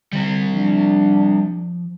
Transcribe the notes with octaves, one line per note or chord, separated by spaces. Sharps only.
D3 G3 C4
F3 D4